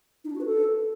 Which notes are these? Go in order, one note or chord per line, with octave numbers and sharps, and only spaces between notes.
D#4
D4
F#4
B4
A4